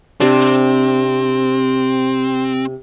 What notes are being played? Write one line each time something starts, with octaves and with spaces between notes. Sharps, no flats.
C3 C4 D4